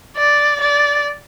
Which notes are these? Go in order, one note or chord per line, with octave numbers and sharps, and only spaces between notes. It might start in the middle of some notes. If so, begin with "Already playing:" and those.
D5
D5